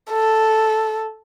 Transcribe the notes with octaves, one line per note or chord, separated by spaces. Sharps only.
A4